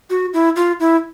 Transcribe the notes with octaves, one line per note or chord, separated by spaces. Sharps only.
F#4
E4
F4
E4